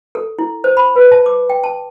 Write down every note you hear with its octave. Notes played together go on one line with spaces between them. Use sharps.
A4
E4
C5
B5
B4
A5
D6
G5
A5